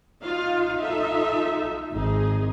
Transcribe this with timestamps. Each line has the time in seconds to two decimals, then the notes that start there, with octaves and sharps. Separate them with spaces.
0.25 D#4 F4 F5
0.80 F4 A4 E5
1.92 G#1 D#4 G#4